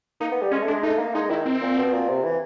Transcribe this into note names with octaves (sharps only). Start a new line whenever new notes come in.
A#3 D#4
B3
G3
G#3 C#4
A3
D4
G#3
A3 D#4
A#3
G#3 D#4
D#3 E4
C4
A#2
B2
A#2
C3
E3